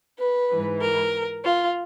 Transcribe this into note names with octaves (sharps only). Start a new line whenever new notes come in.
B4
G#2 E3
A#4
F4